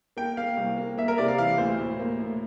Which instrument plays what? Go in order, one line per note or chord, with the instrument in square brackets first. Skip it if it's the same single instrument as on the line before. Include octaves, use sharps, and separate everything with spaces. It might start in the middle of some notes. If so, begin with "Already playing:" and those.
[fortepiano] A#3 [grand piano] G5
[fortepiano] A#3 [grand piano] F5
[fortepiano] C2
A#3
[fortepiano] A#3 [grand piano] E5
[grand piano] A#4
[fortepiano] C3 [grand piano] D5
[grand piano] F5
[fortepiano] E3 [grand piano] F5
[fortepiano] D2 [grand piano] C5
[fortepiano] A2
A#3
A2